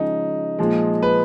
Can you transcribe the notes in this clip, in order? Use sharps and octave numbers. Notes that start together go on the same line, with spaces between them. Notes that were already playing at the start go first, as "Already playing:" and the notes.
Already playing: C#3 F3 G#3 D#4
A#2 F3 G#3
B4